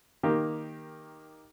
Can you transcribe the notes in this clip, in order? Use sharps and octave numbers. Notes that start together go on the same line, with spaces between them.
D#3 A#3 G4